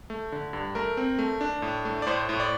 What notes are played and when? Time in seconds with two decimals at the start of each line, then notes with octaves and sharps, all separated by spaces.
0.10 A3
0.32 D3
0.53 G2
0.75 A3 A#4
0.97 C4
1.19 A3
1.41 D4
1.62 A2
1.85 A3
2.02 D5
2.07 A2 C5
2.29 A2
2.40 D5